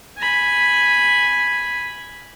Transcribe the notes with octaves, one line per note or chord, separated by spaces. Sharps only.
G#5 B5